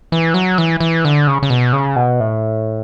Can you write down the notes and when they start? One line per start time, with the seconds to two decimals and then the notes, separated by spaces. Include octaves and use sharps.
0.12 E3
0.34 F#3
0.58 E3
0.80 E3
1.05 D3
1.27 C#3
1.42 C#3
1.50 B2
1.73 C#3
1.96 B2
2.20 A2